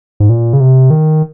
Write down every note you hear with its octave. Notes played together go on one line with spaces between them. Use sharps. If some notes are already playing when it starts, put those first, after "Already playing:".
G#2
A#2
C#3
C3
D#3